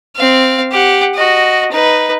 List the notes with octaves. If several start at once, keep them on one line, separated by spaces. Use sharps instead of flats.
C4 F5
G4 F#5
F#4 D#5
D#4 B4